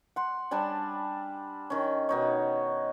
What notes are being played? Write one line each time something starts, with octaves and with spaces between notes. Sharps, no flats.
F#5 C6
G3 D4 G#5 A5
D#3 C#4
B2 D#4 C#5